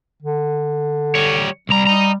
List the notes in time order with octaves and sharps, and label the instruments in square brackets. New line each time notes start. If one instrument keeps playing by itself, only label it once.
[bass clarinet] D3
[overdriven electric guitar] G3 C#5
[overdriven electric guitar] C2 A#5 [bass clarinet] G3
[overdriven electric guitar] D#5 A#5